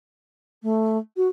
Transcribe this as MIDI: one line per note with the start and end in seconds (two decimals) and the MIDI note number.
0.62 0.97 57
1.16 1.28 66